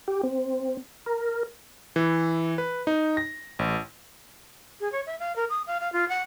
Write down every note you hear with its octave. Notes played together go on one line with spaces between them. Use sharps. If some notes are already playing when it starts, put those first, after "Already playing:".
G4
C4
A#4
E3
B4
D#4
A#6
A1
G#4
C#5
E5
F5
A#4
D#6
F5
F5
F4
F#5